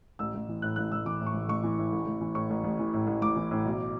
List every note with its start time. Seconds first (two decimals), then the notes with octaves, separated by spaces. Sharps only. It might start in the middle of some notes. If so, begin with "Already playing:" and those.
0.19 A1 E6
0.34 A1
0.48 E3
0.62 A2 F#6
0.76 A1 F#6
0.92 A1 E6
1.05 E3 D6
1.20 A2
1.27 C#6
1.34 A1
1.48 A1 C#6
1.63 E3
1.78 A2
1.93 A1
2.06 A1
2.21 E3
2.35 A2 C#6
2.50 A1
2.64 A1
2.79 E3
2.93 A2
3.07 A1
3.22 A1 D6
3.36 E3
3.51 A2
3.65 B1